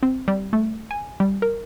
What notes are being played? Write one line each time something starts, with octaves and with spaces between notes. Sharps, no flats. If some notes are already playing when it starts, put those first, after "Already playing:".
C4
G3
A3
G#5
G3
A#4